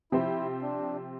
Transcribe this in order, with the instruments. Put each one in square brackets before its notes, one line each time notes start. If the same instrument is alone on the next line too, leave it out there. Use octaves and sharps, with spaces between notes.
[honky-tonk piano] C3 F3 C4 G4 C5 [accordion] E4
[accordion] D4